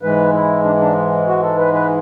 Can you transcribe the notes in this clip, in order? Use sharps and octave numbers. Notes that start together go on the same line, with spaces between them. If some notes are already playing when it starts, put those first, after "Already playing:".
G#2 E3 G#3 B4
E4
D4
D4
F#4
A4
B4
B4